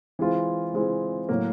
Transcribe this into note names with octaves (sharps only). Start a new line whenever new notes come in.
E3 G#3 C4 F4
E3 G#3 C4 F4
A2 F#3 A#3